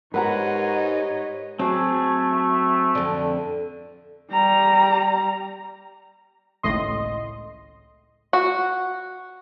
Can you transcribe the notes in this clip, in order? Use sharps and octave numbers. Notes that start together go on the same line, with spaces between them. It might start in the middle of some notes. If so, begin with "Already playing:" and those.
G#2 G4 A#4 B4 C#5 D#5 F#5 A#5
F#3 A3 C4 G#4 D6
F2 D3
G3 A#5
G#1 C#2 A2 D#5 C6
F#4